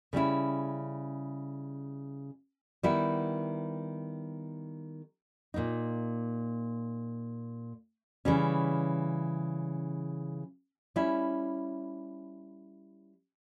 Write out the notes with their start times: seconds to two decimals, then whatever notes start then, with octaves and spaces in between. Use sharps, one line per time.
0.13 C#3 G3 C#4 E4
2.83 D#3 G3 B3 E4
5.54 A#2 A#3 D#4
8.25 C#3 E3 G3 C#4
10.96 G3 C#4 E4